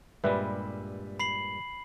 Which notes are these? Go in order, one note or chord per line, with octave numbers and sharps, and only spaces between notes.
G2 A#2 G3 G#3 B4 E5
B5 C7 F#7